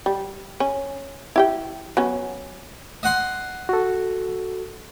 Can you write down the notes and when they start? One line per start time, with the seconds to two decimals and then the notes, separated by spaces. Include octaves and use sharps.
0.06 G3
0.60 C#4
1.36 E4 G4 G5
1.97 F#3 B3 C#4
3.03 D#5 F#5 C6
3.69 F#4 A4